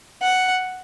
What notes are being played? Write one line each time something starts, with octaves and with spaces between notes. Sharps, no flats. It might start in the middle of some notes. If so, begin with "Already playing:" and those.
F#5